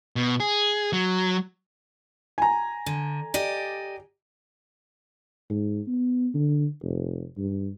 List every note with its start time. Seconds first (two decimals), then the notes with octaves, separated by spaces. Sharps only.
0.16 B2
0.40 G#4
0.93 F#3
2.38 G#5 A#5
2.86 D3
3.34 G4 D5 D#5
5.50 G#2
5.87 B3
6.34 D3
6.83 F1
7.37 G2